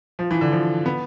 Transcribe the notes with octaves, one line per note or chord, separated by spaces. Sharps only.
F3
E3
D3
F3
B3